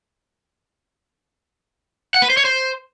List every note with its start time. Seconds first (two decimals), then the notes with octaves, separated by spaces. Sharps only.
2.14 F#5
2.22 B4
2.30 C5
2.37 C#5
2.45 C5